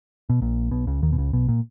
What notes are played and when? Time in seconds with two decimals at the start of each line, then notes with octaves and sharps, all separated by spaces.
0.30 B2
0.41 A#1 A#2
0.71 B1 B2
0.87 C#2 C#3
1.02 D#2 D#3
1.12 B2
1.18 C#2 C#3
1.33 B1 B2
1.49 A#2